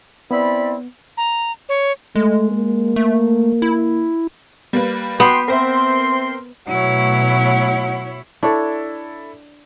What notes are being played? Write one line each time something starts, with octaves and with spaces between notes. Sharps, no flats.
B3 C4 E4 D5 B5
A#5
C#5
G#3 A3
A#3
A3
E4
G3 A#3 B4
B3 F#4 G5 C6
C4 A#4 C5 E5 C6
B2 F#3 A3 E4 C#5
D4 E4 A4 C#5